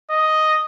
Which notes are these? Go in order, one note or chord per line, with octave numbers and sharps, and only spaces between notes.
D#5